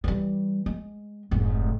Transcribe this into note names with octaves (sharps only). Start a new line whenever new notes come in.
E3 G3
G#3
F1 G#2